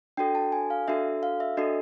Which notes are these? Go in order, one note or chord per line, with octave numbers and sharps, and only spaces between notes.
D4 F#4 A4 G5
A5
G#5
F5
D4 F#4 A4 E5
F5
E5
D4 F#4 A4 D#5